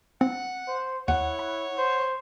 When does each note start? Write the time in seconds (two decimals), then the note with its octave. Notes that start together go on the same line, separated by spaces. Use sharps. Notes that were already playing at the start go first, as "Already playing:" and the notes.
0.21 C4 F#5
0.67 C5
1.08 D#2 E4 C#5 F#5 C#7
1.39 B5
1.78 C5